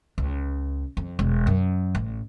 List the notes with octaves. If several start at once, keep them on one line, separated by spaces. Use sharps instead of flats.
C#2
F2
E1
F#2
A1